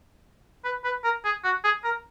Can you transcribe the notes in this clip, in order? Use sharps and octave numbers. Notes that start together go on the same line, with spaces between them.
B4
B4
A#4
G#4
F#4
G#4
A#4